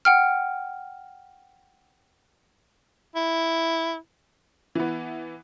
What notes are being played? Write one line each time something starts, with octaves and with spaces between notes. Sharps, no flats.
F#5 G5 F6
E4
E3 B3